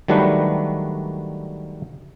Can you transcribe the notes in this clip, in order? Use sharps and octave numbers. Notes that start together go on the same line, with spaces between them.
D#3 F#3 G3 A3 D4 B4